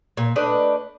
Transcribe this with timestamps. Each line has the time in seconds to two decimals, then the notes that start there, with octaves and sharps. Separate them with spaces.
0.17 A#2
0.36 A3 D4 B4 D#5